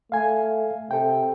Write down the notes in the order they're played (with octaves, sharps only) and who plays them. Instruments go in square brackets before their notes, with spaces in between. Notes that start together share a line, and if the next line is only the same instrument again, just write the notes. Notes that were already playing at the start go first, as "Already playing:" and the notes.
[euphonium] A3 [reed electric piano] F5 G#5
[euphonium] C3 [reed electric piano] A4 G5